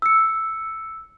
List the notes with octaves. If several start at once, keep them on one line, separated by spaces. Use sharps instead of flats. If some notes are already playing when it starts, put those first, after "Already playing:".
E6 C#7